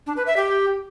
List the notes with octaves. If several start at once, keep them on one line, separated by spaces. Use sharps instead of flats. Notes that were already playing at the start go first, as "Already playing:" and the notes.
D4
B4
E5
G4